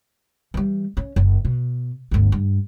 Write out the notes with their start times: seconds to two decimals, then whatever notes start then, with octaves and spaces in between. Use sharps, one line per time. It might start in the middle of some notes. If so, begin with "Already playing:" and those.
0.54 E3 G3
0.97 C#4
1.16 F#1
1.45 B2
2.11 G1 D2
2.32 G2